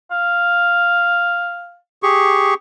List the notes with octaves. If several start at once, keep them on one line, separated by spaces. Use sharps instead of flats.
F5
G4 G#4 C#6